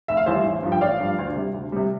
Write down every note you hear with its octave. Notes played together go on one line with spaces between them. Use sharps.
F1 E5
F5
E2 E3 G3 C5 E5
A1
G2 F3
G5
A1 D5 F5
G2 F3
D2
C3 G3
D2
C3 G3